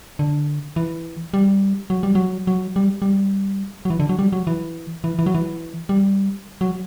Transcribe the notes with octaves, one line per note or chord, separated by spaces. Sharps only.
D3
E3
G3
F#3
G3
F#3
F#3
G3
G3
F#3
E3
D3
F#3
G3
F#3
E3
E3
E3
F#3
E3
G3
F#3